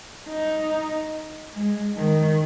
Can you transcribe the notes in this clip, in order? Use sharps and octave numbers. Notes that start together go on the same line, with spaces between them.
D#4
G#3
D#3